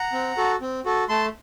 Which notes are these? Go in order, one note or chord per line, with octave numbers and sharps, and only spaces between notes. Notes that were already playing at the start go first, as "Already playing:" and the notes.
Already playing: F#5 A#5
C4
F#4 A4
C4
F#4 A4
A3 A5 C6